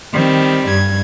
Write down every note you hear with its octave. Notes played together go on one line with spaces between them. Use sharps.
D#3 G3 C4
G2 G#6